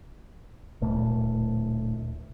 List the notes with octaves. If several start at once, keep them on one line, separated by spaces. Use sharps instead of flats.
D1 A#2 A3